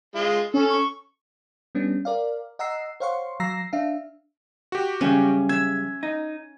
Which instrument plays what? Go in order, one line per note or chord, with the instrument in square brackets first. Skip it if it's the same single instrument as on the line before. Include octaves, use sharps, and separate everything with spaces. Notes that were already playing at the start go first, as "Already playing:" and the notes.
[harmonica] G#3 F4
[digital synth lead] C#4 [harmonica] A4
[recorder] C#6
[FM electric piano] G3 B3 C#4 D4
A#4 D5 F5
D#5 F#5 A#5 E6 C7
C5 C#5 F5 F#5 C6 C#6
F#3 F5 A#5 E6 A#6 C7
D4 E5 F5
[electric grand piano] F#4 G4
[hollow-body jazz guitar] F#2 C#3 G3 [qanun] C#4
[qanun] E5 [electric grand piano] G#6
[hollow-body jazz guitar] D#4